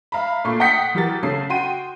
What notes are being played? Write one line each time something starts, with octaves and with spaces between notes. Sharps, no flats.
E5 F5 A#5 B5
A#2 A3 C#6 C7
F#5 G5 D#6 G6 B6 C#7
E3 F#4 G4 A#4 A6
C#3 A4 C7
F#4 G5 C6 D#7